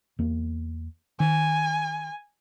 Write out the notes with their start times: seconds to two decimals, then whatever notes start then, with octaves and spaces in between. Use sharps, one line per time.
0.19 E2 A#3
1.20 D#3 G#5